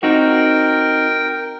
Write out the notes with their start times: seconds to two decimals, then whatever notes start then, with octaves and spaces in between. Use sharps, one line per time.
0.03 C4 D#4 F#4 A#4 G5